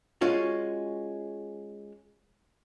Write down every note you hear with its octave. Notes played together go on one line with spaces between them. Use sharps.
G#3 C#4 F4 F#4